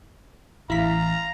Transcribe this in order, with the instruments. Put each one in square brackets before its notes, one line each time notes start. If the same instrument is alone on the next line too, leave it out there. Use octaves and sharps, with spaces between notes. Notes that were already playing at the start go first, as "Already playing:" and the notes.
[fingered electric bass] A1 [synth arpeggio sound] E4 B6 [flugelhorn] F5 [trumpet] A#5